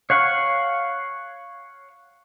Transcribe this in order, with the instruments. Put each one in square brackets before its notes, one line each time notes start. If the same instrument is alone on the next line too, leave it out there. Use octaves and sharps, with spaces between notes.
[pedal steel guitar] C#5 F5 F#5 C#6